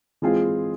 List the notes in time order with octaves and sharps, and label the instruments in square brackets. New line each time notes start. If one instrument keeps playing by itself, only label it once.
[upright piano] E3 G#3 C4 F4 G#4